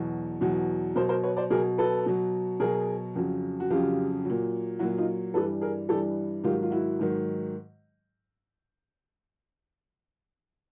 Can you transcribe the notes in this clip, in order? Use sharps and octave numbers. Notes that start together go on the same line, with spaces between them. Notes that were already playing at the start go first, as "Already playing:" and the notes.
Already playing: E2 B2 F#3
E2 B2 F#3
B2 F#3 A#4 C5
A#4 C5
B4 C#5
C5 D5
B2 F#3 G#4 A#4
A4 B4
B2 F#3
B2 F#3 G#4 A#4
F2 C#3 F#3
F#4
F2 C#3 F#3 F4 G4
A#2 F#3
A#2 F#3 E4 F#4
D#4 F4
G2 E3 G3 A4 B4
G#4 A#4
G2 E3 G3 G4 A4
G#2 D#3 F#3 F4 G4
F4
E4 F#4
G#2 D#3 F#3